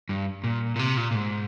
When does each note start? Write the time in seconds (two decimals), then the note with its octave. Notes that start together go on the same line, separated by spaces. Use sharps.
0.09 G2
0.44 A#2
0.76 A#2
0.79 C3
0.97 A#2
1.11 A#2
1.15 G#2